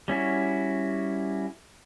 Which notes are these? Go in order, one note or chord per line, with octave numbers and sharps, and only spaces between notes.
G3 C#4 E4 F#4